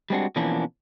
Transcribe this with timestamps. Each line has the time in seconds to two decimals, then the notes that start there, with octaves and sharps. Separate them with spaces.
0.10 G3 G#3 C4 D4 F#4
0.36 B2 E3 F3 A#3 C#4 D4